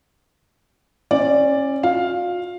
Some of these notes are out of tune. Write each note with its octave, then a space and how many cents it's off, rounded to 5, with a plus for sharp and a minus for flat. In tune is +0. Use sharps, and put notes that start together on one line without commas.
C#4 -25 D5 +0
F4 +45 F5 +5